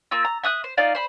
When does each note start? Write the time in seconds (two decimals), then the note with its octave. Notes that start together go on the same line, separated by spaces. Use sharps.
0.11 A#3 F4 E6
0.25 A#5
0.43 E5 D#6 F#6 G6
0.64 C5
0.77 D#4 F4 D5 F5
0.95 C5 B5